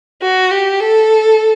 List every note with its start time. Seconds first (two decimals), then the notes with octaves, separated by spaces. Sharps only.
0.22 F#4
0.51 G4
0.80 A4